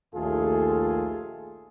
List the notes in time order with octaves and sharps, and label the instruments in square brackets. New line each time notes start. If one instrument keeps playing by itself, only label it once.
[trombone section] A#1 D#2 A3 F4 G#4 A4